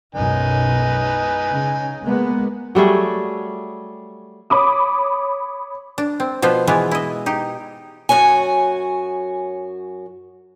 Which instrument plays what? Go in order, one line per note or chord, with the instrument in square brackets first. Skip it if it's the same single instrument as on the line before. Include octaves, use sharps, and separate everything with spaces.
[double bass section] B1 F#2 [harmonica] D#4 B4 G#5
[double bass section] C#3
G#3 A#3 B3
[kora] F#3 G3 A3 G#4
[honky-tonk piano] C#5 B5 D6 D#6
[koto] D4
C4
B2 F3 B3 C5
E3 G#3 B3 F4
E4 D#5
D#4 G4
[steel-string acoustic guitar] F#2 F#4 C#5 G#5